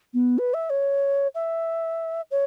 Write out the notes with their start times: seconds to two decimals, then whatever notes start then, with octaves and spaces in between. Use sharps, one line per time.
0.14 B3
0.38 B4
0.54 E5
0.70 C#5
1.35 E5
2.31 C#5